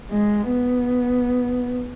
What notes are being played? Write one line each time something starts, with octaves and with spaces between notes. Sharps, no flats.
G#3
B3